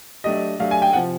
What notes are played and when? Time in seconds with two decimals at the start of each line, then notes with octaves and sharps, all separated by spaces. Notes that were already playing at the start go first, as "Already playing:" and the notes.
0.24 F#3 A3 D4 G4 D#5
0.59 F#3 A3 D4 G4 F5
0.71 G#5
0.82 G5
0.93 C3 F3 F#5